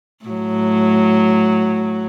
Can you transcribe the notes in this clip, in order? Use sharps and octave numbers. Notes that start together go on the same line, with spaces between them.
A2 F#3